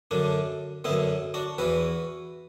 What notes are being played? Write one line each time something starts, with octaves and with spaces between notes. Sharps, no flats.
F#2 D3 D4
F#2 D3 B3 E4
D4 F#4
E2 E3 F#4 B4